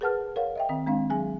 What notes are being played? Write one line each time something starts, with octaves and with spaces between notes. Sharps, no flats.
G#4 A#4 B4 F#5 A5 F6
A#4 C#5 F5 F#5
D#5 E5 G5
D#3 C4
G#3 C4 D4 F5
F#3 G#4 G#5